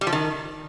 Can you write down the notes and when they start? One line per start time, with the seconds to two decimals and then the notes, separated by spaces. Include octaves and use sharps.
0.01 G3
0.07 F3
0.13 D#3